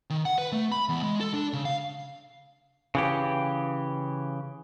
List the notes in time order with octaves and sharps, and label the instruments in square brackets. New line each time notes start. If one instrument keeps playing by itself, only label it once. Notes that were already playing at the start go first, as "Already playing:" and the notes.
[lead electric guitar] D#3
F#5
B4
A3
B5
E2
G#3
A4
D4
C#3
F5
[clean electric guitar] C#3 E3 G4